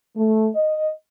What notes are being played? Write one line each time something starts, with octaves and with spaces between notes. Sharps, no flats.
A3
D#5